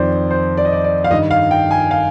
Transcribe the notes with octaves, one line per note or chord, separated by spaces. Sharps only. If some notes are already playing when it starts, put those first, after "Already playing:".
Already playing: F2 D#3 C5 D5
C5
D5
D#5
D5
D5
F5
G2 D#3 D#5
F5
G5
G#5
F5